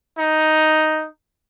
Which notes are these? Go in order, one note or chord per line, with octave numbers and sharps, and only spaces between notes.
D#4